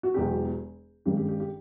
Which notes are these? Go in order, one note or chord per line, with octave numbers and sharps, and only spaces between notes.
F#4
E1 E2 B2 F#3 G4
G#1 G2 D#3 G#3 C#4 G4
G4
G4
G4